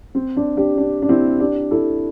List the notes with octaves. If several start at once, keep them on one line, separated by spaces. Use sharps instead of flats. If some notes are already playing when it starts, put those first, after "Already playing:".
C4
D4
D4 G4
D4
D4
C4 E4
D4 G4
E4 A4